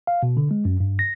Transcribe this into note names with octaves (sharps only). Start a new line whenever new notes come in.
F5
B2
D3
G#3
F#2
G2
A#6